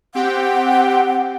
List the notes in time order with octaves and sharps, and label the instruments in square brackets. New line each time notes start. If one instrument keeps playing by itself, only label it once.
[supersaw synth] C4 G4 G5 [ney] F#5